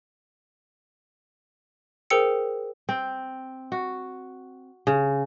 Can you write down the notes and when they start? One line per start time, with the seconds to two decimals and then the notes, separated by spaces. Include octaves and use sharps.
2.10 G#4 A#4 C5 G5 E6 C#7
2.89 C4
3.72 F#4
4.87 C#3